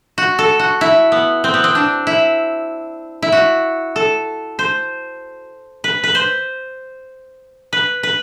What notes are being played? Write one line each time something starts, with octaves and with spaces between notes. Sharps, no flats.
F#4
A4
F#4
E4
B3
C4
B3
C4
D4
E4
E4
F#4
A4
C5
B4
B4
C5
B4
B4